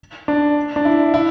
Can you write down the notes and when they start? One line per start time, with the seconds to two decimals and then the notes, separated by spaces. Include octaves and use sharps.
0.28 D4
0.76 D4
0.85 E4
1.14 E4